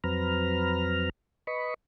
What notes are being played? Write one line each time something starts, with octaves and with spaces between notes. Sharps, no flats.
F2 F#3 C4 B4 A#5 F6
B4 D#5 B5 C#6